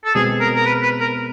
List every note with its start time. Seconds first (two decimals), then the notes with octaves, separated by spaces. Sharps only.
0.05 A4
0.15 B2 G#3 C4 G#4
0.41 A#4
0.56 A#4
0.66 B4
0.83 B4
1.01 A#4